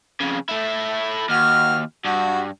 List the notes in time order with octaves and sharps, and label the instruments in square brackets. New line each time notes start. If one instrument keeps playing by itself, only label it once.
[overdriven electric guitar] F2 C#3
A3 E4
[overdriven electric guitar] D#2 [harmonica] F#4 F6
[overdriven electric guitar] G2 [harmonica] F#4